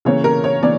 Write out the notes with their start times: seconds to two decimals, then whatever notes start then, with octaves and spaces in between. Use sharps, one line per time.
0.05 C#3 E3 A#3 C#5
0.24 A#4
0.44 C#5
0.62 E3 A#3 D5